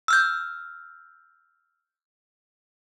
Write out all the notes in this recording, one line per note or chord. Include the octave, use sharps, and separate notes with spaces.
E6 F6 G6